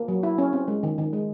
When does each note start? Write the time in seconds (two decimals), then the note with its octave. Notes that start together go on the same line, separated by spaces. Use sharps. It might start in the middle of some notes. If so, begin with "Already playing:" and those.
Already playing: A#3
0.08 F#3
0.23 E4
0.38 C#4
0.53 C4
0.68 G#3
0.83 D#3
0.98 D#3
1.13 G#3